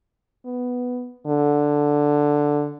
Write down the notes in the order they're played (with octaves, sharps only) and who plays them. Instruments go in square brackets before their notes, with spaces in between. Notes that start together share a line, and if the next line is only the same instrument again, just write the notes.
[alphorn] B3
D3